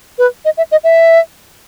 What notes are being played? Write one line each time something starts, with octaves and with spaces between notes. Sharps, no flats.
B4
D#5
E5
D#5
E5